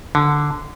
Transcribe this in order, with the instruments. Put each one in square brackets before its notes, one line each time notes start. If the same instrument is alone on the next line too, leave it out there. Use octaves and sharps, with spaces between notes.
[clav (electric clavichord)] D3